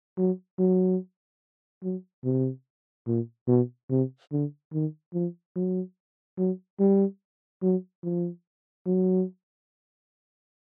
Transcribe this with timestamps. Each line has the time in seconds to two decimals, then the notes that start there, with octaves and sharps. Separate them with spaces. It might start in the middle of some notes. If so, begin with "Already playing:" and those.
0.18 F#3
0.59 F#3
1.83 F#3
2.24 C3
3.07 A#2
3.48 B2
3.89 C3
4.32 D3
4.73 D#3
5.14 F3
5.56 F#3
6.38 F#3
6.80 G3
7.62 F#3
8.03 F3
8.86 F#3